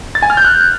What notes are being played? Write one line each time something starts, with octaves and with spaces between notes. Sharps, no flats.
A6
G#5
F6
G6
F#6